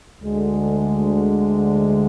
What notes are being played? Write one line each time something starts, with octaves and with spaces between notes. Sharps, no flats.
D2 D3 G#3